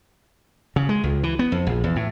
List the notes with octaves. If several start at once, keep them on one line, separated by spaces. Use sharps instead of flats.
C#3
G#3
C#2
E3
B3
F2
A#1
E2
A2